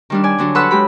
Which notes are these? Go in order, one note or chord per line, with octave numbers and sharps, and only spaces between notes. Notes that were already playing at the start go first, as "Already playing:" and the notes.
D#3 G3 D4
D5 G#5
D3 F#3 D4
A4 B4 C#5 F#5 C6 E6
G#3 G4 B5